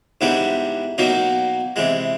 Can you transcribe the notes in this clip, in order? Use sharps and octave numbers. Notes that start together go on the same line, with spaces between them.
G#2 E3 G3 B3 D4
B2 F#3 A#3 D#4
C3 E3 G#3